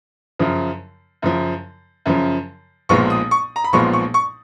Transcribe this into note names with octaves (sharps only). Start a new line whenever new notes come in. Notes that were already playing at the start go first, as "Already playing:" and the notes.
F#2 C#3 F3
F#2 C#3 F3
F#2 C#3 F3
B1 A#2 F3 G#3 B3 C#6
D#6
C#6
A#5
B5
B1 A#2 F3 G#3 B3 C#6
C#6
C#6